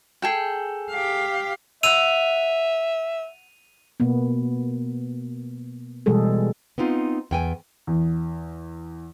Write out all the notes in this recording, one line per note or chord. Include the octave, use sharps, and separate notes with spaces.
G#4 A4 G5
G4 F5
E5 F#5 E6 D#7 F7
B2 A#3 B3
B2 E3 G3 G#3 G#4 A4
B3 C4 D#4 F4
E2 G5 G#5
E2